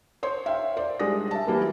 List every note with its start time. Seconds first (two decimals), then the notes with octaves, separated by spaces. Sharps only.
0.23 C5 C#5 C6
0.46 E5 F5 G5
0.77 C5 D5 C6
1.00 G3 G#3 D4 D#6 A#6
1.31 E5 A5
1.47 E3 F#3 G3 A#3 B4